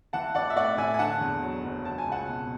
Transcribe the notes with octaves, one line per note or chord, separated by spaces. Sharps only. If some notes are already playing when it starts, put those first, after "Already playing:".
E3 F#5 A5
A1 D5 F#5
E5
A2 D5 F#5
A1 E5 G#5
G#5
D3 F#5 A5
E2
F#3
F#1
F#3 A5
G#5
C#2
F#5 A5
B2